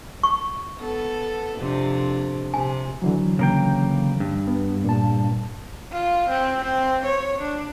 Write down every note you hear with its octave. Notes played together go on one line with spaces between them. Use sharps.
C#6
B3 A4
F2 C3 D4
C3 G#5
D3 E3 F#3
C#3 A#3 G5
G2
B3
A#2 A5
F4
C4
C4
C#5
D4